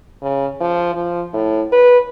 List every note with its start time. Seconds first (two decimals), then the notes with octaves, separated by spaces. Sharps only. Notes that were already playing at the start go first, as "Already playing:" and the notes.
0.23 C#3
0.61 F3
0.95 F3
1.33 A2
1.72 B4